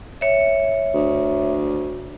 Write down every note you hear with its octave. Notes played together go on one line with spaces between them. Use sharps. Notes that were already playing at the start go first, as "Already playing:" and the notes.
C#5 E5
D2